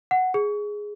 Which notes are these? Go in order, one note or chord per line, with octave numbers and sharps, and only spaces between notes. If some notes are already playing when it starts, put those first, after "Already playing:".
F#5
G#4